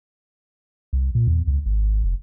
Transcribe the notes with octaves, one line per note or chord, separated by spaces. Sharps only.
C2
A#2
E2
C#2
G#1
F1